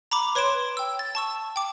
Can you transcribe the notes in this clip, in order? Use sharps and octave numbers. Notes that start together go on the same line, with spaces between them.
A#5 B5 D6
B4 C#5 C6 D7 E7 G7
G5 E6
A6
A5 C#6 E6
G5 D6